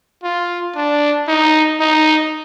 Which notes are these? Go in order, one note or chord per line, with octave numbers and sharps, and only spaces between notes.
F4
D4
D#4
D#4